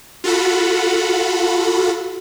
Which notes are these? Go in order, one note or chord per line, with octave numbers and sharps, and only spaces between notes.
F4 F#4 A4 F#5 B5